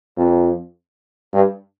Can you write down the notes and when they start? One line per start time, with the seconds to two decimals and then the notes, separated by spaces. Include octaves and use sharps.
0.17 F2
1.33 G2